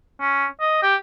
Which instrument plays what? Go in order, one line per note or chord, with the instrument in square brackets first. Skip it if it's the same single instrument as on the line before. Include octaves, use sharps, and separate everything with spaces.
[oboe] C#4
D#5
G4